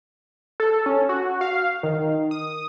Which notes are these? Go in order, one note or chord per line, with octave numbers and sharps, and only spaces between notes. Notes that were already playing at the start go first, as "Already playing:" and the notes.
A4
C#4
F#4
F5
D#3
D#6